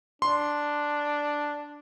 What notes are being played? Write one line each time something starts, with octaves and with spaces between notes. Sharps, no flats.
D4 C6